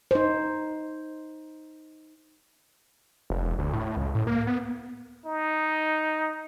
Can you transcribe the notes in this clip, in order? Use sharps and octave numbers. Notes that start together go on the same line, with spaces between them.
D#4 C5
F1
E1
D2
A2
C#2
A2
A#3
B3
D#4